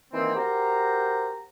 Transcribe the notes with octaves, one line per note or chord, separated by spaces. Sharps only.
D#3 E3 A#3 C4
F#4 G4 A#4 C5 A#5